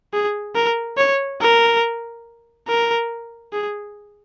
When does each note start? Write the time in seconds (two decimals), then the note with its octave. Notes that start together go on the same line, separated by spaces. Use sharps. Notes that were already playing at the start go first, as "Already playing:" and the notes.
0.13 G#4
0.55 A#4
0.98 C#5
1.41 A#4
2.68 A#4
3.53 G#4